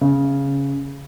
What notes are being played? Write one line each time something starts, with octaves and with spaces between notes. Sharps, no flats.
C#3